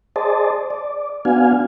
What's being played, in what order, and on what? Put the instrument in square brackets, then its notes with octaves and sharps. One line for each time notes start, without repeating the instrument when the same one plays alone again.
[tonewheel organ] G#4 C5 D5 D#5 A5
D5
B3 D4 F#4 F5 G#5